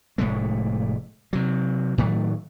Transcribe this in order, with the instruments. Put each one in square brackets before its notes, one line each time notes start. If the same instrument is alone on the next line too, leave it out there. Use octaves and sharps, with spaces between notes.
[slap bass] F1 A2 G#3 A3
C3 F#3
A2 D#3 F#3 A3